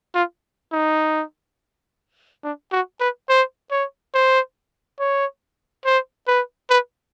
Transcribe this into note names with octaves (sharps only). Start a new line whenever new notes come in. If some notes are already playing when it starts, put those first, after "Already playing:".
F4
D#4
D4
F#4
B4
C5
C#5
C5
C#5
C5
B4
B4